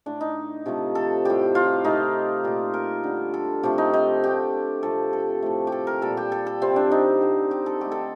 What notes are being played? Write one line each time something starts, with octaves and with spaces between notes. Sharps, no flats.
A2 A3 D4
D#4
C3 F3 A3
A4
A2 G3 G4
F4
C3 D#3 A3 D#4
A#2 A3 G4
A#4
D3 G3
A4
C3 F3 A3 G4
D#4
D#4
D3 A3 G4
C3 F3 A3 A4
A4
A2 F3 A3
G4
A4
A#4
A#2 G3 A4
G4
A4
A4
C3 G3 C4
D4
D#4
D3 G3
G4
A4
D3 A3 G4
A4